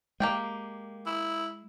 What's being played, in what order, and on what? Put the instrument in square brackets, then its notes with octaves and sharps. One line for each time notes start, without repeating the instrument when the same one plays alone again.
[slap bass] G#3 [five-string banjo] A#3 G4 G5
[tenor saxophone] E4